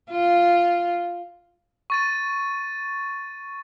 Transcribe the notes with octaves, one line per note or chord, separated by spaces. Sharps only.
F4
C#6 A6 D#7